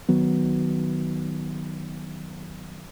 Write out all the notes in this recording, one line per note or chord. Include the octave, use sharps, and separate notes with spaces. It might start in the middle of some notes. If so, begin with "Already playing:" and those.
D#3 F#3 B3